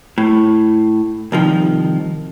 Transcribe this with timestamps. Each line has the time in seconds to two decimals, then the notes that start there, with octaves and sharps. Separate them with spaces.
0.18 A2
1.32 C2 D#3 F3